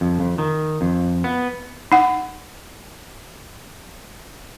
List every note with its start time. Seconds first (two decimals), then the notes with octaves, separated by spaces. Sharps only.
0.01 F2
0.20 F2
0.38 D#3
0.81 F2
1.24 B3
1.92 D#4 F#5